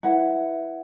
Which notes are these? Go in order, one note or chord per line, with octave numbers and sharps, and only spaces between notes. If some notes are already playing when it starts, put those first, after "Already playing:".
E4 B4 F#5